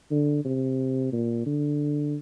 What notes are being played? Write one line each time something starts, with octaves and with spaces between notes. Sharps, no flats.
D3
C3
A#2
D3